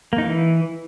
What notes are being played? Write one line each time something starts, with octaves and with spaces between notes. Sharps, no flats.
A#3
D#4
E3